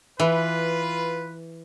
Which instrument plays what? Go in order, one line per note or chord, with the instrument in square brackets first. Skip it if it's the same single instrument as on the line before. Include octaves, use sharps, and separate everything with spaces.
[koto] E3 [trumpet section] F4 B4